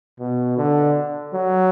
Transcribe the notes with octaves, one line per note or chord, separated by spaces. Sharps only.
B2
D3
F#3